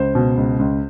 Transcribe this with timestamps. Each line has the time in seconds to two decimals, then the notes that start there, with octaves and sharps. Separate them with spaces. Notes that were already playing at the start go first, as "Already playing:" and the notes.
Already playing: C#2 C5
0.15 B2
0.37 C#2
0.59 C#2